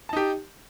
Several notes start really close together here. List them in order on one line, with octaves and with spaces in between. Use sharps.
A5 D#4 G4